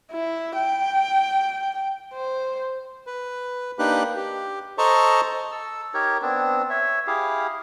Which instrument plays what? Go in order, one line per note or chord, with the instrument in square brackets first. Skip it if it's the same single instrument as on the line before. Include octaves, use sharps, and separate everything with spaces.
[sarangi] E4
G5
C5
[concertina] B4
A#3 D4 D#4 G4 B4 F#6
G4
A4 C5 D#5 A5 A#5 C#6
[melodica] A4 E6
D#4 G4 A#4 C#5
B3 C4 D4
C#5 E5
E4 G4 G#4 F5